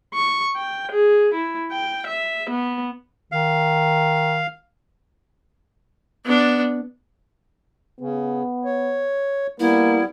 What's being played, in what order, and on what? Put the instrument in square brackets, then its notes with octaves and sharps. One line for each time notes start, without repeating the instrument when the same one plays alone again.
[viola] C#6
G5
G#4
E4
G5
E5
B3
[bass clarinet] D#3 [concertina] F5
[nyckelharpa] B3 D4
[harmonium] C#3 [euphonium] B3
[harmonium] C#5
[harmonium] G3 B3 [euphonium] A#3 [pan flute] E4